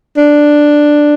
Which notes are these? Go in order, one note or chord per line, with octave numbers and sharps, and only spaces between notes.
D4